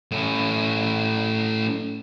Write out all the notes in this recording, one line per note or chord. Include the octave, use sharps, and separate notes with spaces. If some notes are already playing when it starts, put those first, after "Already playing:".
A2 C#4